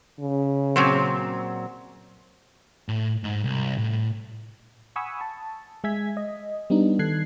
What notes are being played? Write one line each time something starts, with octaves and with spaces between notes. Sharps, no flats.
C#3
A#2 F#3 C4
A2
G#2
C2
A2
F#5 G#5 B5 C#6 D#6 E6
A5
G#3 E5 G#5 G#6 B6
D#5
G3 B3 D4 D#4
D#3 A4 F#6 G#6 C7